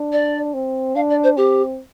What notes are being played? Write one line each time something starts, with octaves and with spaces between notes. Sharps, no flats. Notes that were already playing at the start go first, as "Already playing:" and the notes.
Already playing: D4
D5
C4
D4 F5
D5
C5
C4 G4